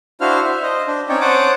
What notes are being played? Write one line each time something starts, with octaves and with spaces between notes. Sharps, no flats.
D4 E4 F#4 C5 F5 F6
E5
C5 D#5
D4
C4 C#4 D#4 C#5 D5 G5
C5 C#5 F#5 A5 D6 D#6